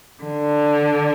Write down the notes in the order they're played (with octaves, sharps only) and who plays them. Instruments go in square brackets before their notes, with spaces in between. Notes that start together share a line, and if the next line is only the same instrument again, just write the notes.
[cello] D3